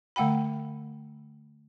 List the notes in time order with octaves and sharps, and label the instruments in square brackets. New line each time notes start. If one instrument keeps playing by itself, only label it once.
[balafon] D3 A3 F#5 G5 B5